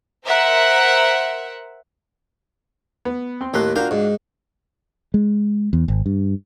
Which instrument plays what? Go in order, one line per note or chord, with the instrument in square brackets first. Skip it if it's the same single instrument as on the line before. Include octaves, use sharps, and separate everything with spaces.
[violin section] A#4 C5 E5 F#5
[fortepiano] B3
C4 C6
[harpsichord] D#2 A#3 C6 [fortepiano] A2 F#6
[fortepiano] D4 F4 F#4 [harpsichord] A#4 F5 G5
[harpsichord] G#2
[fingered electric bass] G#3
E2
G#1
G2